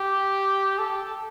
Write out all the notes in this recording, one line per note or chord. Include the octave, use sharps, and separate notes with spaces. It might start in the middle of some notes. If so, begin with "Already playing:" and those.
Already playing: G4
A4